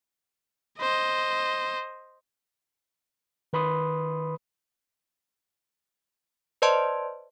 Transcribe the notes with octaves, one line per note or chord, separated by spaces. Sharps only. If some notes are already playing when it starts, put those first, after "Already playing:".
C5 D#5
D#3 B4 B5 C6 D#6
B4 C5 D5 D#5 A5 C6